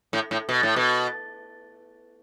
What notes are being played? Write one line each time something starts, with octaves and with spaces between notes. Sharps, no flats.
A2
A2
B2
A2
B2